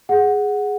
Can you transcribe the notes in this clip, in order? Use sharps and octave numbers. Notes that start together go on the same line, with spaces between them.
G#4 F#5